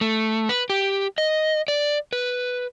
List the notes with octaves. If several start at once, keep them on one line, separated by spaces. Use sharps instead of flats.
A3
B4
G4
D#5
D5
B4